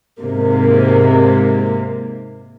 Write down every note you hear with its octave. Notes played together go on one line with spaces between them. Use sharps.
G#2 C3 A#3